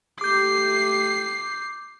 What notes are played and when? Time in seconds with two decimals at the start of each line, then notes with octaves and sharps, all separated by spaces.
0.21 A3 G4 D6 G6 C7